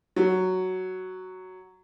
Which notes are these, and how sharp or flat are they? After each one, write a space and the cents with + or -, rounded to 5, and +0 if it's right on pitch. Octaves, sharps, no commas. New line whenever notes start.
F#3 +5